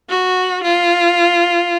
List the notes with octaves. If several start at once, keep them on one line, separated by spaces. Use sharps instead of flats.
F#4
F4